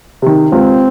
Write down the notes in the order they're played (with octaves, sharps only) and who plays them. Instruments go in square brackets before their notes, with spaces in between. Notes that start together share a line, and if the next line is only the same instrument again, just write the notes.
[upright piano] C3 D#3
[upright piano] C#2 [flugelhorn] C4